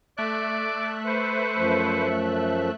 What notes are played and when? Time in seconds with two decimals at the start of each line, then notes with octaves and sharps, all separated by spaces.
0.18 A3 D5 E5 F#6
1.06 B4 C5 C#6
1.58 F#2 F3